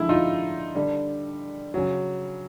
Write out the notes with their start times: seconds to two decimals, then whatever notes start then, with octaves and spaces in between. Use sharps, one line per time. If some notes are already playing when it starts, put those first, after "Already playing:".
Already playing: D3 F3 G#3 E4
0.09 D#4 F4
0.75 D3 G3
1.74 C#3 F#3